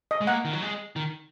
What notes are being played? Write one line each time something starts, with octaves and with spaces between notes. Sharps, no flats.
D#5
G#3
A#3 F#5
D#3
F#3
G#3
D#3